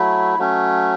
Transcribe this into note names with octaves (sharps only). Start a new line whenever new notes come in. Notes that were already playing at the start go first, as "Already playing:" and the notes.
Already playing: F#3 A3 E4
F#3 A3 C#4